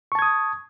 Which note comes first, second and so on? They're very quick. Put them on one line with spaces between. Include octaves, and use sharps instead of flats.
C#6 A5 G#6 D#6